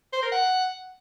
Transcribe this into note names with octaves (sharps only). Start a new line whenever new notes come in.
C5
A#4
F#5